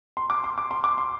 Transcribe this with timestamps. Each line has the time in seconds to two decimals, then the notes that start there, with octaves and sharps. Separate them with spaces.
0.17 C6
0.30 D6
0.44 C6
0.58 D6
0.71 C6
0.84 D6
0.98 C6